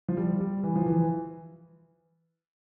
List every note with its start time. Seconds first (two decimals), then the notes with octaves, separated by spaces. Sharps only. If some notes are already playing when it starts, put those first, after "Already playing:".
0.08 F3
0.17 G3
0.41 G3
0.64 E3
0.76 F3
0.86 E3